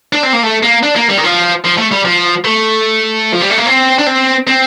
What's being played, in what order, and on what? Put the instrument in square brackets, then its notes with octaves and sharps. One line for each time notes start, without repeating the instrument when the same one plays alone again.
[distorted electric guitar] D4
C4
A#3
A3
A#3
D4
A#3
G3
D#3
F3
F3
A3
G3
F3
A3
F3
G3
A3
A#3
C4
D4
C4
C4